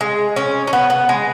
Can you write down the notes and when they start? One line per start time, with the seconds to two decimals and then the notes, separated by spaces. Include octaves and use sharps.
0.01 G#3
0.36 C#4
0.67 C#4
0.73 B3
0.90 B3
1.09 G#3